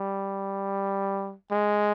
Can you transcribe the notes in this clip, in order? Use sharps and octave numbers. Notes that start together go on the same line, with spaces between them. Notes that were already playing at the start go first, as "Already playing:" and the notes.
Already playing: G3
G#3